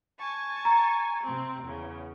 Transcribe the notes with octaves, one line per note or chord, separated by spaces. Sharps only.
G#5 A5 C#6
A#5
C3 C4
E2 C#3